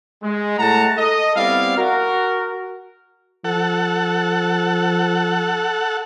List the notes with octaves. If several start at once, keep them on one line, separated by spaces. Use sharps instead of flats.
G#3
A2 G#3 A3 F#5 A5 A#5
A4 D#5
G3 B3 C4 E4 D5 F5
F#4 A#4
F3 A4 F#5